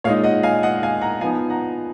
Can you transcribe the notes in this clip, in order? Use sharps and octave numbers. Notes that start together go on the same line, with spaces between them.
A#2 G#3 D#4 C#5 F5
D#5 F#5
F5 G#5
D#5 F#5
F5 G#5
F#5 A#5
F3 B3 D#4 F5 G#5
F#5 A#5